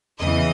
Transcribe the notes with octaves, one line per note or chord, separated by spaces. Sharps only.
E2 C#3 E3 D#5